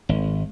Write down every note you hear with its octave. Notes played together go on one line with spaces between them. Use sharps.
G#1